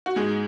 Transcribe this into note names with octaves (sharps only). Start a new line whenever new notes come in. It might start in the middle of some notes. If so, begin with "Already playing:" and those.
F#4
G#2 G#3 G#4